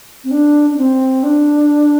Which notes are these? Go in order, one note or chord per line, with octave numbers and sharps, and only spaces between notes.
C4
D4
D4
C4
D4